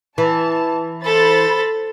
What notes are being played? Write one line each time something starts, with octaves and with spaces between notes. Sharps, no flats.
E3 A5
A4 C5 B5 A6